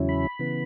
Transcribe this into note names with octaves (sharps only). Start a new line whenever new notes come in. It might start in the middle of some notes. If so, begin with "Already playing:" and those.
Already playing: E2 C#3 F#3 C#4 E4
B5
C#3 E3 B3